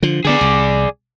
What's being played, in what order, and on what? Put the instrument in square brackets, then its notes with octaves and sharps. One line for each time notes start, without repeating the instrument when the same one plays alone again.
[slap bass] D3 F3
[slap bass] D3 B3 [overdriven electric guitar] G#4 D5
[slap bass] C2